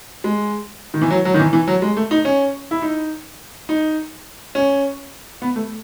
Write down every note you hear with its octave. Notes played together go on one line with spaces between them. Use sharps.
G#3
D#3
E3
F#3
F#3
D#3
E3
E3
F#3
G#3
A3
D#4
C#4
E4
D#4
D#4
C#4
B3
A3